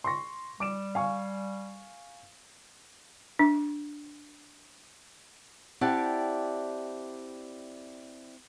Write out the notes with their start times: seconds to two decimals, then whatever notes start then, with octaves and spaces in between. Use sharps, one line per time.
0.04 C6 C#6 A#6
0.60 G3 D6 D7 E7
0.95 F5 G#5 C#6
3.39 D4
5.81 C4 E4 G4 D5 F#5 A5